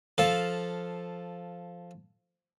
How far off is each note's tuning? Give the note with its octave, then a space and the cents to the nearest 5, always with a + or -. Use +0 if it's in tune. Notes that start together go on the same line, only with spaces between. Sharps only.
F3 +0 A4 +0 F5 +0